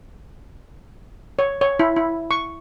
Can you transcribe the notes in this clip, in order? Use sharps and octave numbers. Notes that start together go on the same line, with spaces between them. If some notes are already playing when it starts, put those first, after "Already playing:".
C#5
C#5
E4
E4
C#6